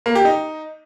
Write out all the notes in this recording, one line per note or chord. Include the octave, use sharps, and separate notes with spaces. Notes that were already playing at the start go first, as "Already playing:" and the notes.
A#3
G4
D#4